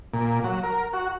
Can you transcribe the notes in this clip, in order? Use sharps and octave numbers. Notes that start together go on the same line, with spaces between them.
A#2
F#3
A#4
F#4